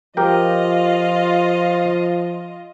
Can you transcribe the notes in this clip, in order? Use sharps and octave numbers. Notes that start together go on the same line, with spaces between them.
F3 F4 G4 A#4 D#5 G5